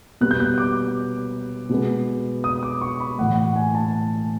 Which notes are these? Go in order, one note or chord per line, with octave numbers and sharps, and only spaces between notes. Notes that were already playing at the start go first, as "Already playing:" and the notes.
B2 G3 B3 F#6
G6
F#6
D6
B2 G#3 B3
D#6
D6
C#6
B5
A2 E3 A3 F#5
F#5
G#5
A5